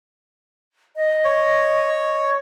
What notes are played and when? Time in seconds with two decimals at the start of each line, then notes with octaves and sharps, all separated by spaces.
0.96 D#5
1.24 C#5